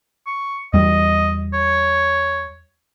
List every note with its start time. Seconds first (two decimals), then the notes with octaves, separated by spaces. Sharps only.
0.26 C#6
0.73 E2 G3 D#5
1.53 C#5